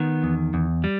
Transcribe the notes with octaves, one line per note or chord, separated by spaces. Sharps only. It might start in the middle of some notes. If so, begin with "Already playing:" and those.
Already playing: D#3 B3
E2
E2
G3